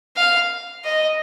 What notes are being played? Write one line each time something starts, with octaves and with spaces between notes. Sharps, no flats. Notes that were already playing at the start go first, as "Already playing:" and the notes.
F5
D#5